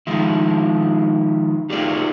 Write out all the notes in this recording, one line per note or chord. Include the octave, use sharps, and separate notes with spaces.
D#3 F3 G#3 E4
D#4 F4 G4 G#4 A#4 D5